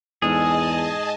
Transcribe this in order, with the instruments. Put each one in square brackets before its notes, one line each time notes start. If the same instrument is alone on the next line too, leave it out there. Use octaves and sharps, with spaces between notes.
[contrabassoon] E2 [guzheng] G#2 G#3 A4 [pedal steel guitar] G#4 [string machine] D#5 G#5 A5